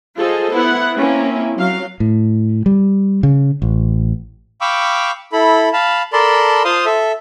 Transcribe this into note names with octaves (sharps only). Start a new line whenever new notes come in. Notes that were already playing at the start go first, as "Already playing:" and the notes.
F4 G#4 A4 C5 D#5
B3 E4 F#5
A#3 C4 C#4 E4
F#3 F5
A2
G3
C#3
A1
F5 G5 B5 C#6 D6 E6
E4 A4 B5
F5 A5 B5
A4 A#4 D5 A5 B5 C6
F4 C5 F5 C6 D#6
A4 E5